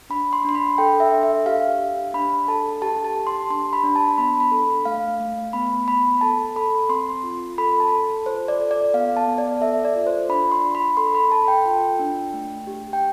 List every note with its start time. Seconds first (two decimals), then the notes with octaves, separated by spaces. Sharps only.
0.10 D4 B5
0.33 C6
0.45 D4 C6
0.55 B5
0.78 A4 G5
1.00 E5
1.12 D4
1.23 E5
1.46 G4 F5
1.80 G4
2.14 D4 B5
2.48 A4 A5
2.82 G4 A5
3.04 A5
3.16 G4
3.27 C6
3.50 D4 C6
3.73 B5
3.84 D4
3.96 A5
4.18 B3 B5
4.40 B5
4.52 A4
4.85 A3 F5
5.20 A3
5.53 B3 B5
5.87 B3 B5
6.21 A4 A5
6.56 A4 B5
6.89 C4 C6
7.23 F4
7.58 A4 B5
7.80 A5
7.92 A4
8.26 F4 C5
8.48 D5
8.59 A4
8.71 D5
8.94 B3 F5
9.17 A5
9.27 B3
9.38 D5
9.61 A4 E5
9.85 D5
9.96 F4
10.06 C5
10.29 D4 B5
10.52 C6
10.63 D4
10.75 B5
10.97 A4 C6
11.15 B5
11.31 A4 A5
11.48 G5
11.65 F4
11.99 D4
12.33 A3
12.67 G4
12.93 G5